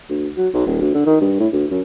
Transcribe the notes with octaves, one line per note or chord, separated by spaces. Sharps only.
D2
F#3
B1
D#1
D2
D3
D#3
G2
A2
D2
F#2